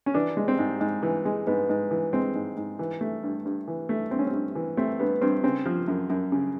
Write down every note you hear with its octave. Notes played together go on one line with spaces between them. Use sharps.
C#4
E3 D4
G#3
C4
G#2
G#2
E3
G#3
G#2 B3
G#2
E3
G#3 C4
G#2
G#2
E3
A3
G2
G2
E3
A3
G2 C4
C#4
C4
G2
E3
A3 C4
G2 B3
G2 C4
C#3 C4
F3
F#2
F#2
C#3